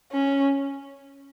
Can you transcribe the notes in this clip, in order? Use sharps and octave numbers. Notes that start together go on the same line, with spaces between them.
C#4